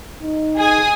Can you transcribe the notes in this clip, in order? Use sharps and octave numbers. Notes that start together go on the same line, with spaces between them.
D#4
G#4 G#5 D#6